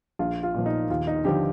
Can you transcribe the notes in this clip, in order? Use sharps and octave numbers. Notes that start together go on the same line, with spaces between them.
A#1 F4
F4
A#2 F3
D#4
D#2 F4
D#4
D3 F3 G4